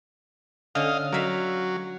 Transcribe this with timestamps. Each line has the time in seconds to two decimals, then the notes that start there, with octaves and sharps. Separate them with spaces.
0.75 D3 C#4 D#5 F5
1.12 F#3 A#4 E5 F5